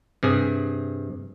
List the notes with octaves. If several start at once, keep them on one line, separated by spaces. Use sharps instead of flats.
G2 C3 G#4